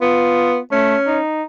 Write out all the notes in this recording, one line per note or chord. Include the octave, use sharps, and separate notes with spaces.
B3 F4
A3 C#4
D#4